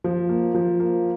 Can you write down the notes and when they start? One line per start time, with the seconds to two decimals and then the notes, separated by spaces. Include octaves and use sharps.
0.04 F3
0.29 A#3
0.54 F3
0.80 A#3